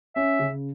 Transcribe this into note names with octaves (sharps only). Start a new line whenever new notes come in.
C#4 E5
C#3